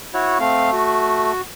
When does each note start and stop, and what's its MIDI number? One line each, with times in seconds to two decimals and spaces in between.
0.14 0.38 64
0.14 0.38 66
0.14 0.38 73
0.40 1.32 57
0.40 0.70 60
0.40 0.70 77
0.73 1.41 66